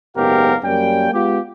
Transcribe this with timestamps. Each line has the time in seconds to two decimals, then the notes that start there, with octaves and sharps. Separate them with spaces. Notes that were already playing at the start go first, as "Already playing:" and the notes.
0.16 F#1 G#2 B3 G4 A#4 F5
0.63 F#2 G3 A#3 C#4 G5
1.12 G#3 B3 F4 G4